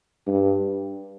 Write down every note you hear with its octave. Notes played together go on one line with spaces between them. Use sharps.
G2